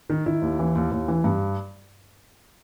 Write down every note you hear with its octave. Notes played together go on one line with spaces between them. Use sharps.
D#3
D#3 E4
D#2
E3
D#2
D#2
E3
G2